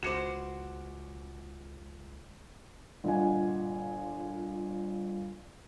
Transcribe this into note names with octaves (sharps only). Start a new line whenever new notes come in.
C#2 F#4 C5 D6 C#7 E7
G1 A#2 D#5 F#5 G#5